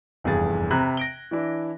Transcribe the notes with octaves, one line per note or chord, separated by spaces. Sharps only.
F1 E2 G2 G#4 A6
C3 A#5 B5 F#6 G#6
A#6 D7 G7
E3 D4 E4